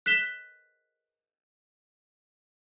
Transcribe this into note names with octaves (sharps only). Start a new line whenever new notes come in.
F#6 B6 E7 G7